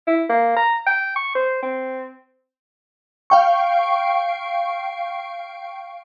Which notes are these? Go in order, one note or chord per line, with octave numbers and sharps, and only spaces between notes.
E4
A#3
A#5
G5
C#6
C5
C4
F5 G5 C#6